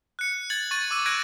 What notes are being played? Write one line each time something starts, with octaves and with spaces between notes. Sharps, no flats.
F#6 C#7
G#6 A6 F#7
C#6 A6 D#7
D6 E6 D#7
F#6 G#6 A#6 D7 D#7